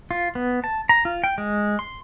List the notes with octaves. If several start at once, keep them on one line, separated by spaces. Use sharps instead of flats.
F4
B3
A5
A#5
F4
G5
G#3
C6